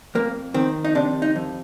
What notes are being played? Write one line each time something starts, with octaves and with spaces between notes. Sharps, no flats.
F2 A#3
D#3 C4
D#4
C3 D4
D#4
F2